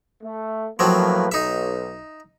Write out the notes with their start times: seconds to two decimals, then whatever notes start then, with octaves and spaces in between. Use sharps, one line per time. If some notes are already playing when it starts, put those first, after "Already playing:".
0.23 A3
0.79 A2 F3 F#3 A#3 C4 B4
1.32 B1 D#4 E5